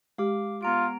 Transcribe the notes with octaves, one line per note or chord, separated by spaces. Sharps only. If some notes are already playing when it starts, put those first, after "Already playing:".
G#3 G4 F5 D6
B3 F4 A#5 D7